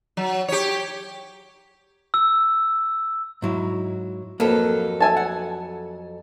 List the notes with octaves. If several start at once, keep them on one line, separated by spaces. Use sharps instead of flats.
F#3
G4 C#5
E6
G#2 F#3 E4
F2 F#3 A#3 A4 B4
E5 G#5 A5
F#5